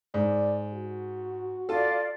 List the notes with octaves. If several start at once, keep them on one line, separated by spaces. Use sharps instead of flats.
G#2 D5
F#4
F4 A4 D5 F5